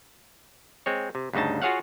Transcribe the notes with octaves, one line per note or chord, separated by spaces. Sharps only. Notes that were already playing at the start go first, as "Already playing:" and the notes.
G#3 C4 C#5
C3
D2 G2 C#3 D#4 A5
F4 F#4 G#4 C#5 F5 F#5